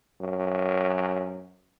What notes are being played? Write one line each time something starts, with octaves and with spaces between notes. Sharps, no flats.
F#2